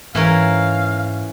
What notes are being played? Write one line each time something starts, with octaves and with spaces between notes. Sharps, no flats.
G#2 E3 C#4 A#4 F5